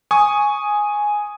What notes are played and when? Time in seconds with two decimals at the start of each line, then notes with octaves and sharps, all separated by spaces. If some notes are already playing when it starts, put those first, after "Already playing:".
0.11 G#5 C#6 D#6